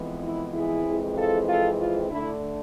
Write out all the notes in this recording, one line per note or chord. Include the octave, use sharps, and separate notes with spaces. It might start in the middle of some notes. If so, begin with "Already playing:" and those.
Already playing: F2 E3 G#3 B3
E4
E4 G#4
F2 E3 G#3 C4
F4 A4
F4 A4
F4
D3 A3 D4 E4